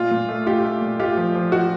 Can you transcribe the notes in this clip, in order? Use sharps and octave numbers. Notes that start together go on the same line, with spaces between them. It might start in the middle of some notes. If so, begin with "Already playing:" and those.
Already playing: A#2 F4
A#2
A3
A3 F4 G4
A3
A#2
A3 F4 G4
F3
F3
F3 F#4